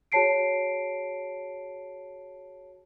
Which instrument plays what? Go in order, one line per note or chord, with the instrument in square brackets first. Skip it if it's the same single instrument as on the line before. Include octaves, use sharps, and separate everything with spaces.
[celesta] F#4 G#4 C#5 A5 C7 D7